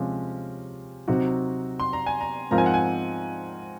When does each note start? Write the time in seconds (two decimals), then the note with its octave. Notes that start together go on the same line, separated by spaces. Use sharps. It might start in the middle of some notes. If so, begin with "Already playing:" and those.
Already playing: C3 F3 G#3 C#4
1.08 C3 F#3 C4 D#4 F#4
1.80 C6
1.93 A#5
2.06 G#5
2.21 A#5
2.51 G#2 F3 C4 F4 A#4 A#5
2.58 G#5
2.66 F#5
2.74 G#5